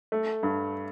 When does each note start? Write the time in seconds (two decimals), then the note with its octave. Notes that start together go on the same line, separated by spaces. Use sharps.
0.12 A3
0.43 G2